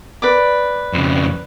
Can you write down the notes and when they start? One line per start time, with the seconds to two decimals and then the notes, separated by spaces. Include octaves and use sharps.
0.22 B4 D5 D6
0.93 F2 C#3